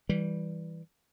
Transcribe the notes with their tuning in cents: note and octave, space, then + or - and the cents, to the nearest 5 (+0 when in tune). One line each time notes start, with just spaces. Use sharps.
E3 -10 G3 +0